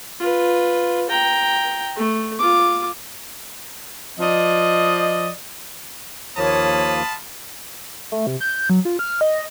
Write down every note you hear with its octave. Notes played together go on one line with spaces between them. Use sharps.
F4 B4
G5 A#5
A3
F4 D6
F3 D5 D#5
D#2 F3 A#3 F4 C#5 A5 B5 D#6
A3
C3
G6
F#3
F4
F6
D#5